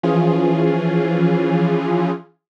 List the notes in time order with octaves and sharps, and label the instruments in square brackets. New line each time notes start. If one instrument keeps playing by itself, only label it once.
[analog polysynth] E3 F3 C#4 F4 G#4